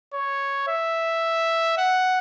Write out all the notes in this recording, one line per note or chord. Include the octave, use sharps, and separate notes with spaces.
C#5
E5
F#5